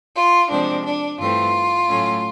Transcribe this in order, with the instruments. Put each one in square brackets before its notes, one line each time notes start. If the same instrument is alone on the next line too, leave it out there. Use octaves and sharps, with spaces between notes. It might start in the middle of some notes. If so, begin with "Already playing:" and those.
[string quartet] F4
C3 F3 G#3 C4 D4
D4
G2 E3 A3 C4 F4
A2 F#3 A3 C#4